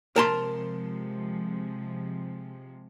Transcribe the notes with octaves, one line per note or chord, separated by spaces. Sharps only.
C3 F3 G#3 A#4 A5 C6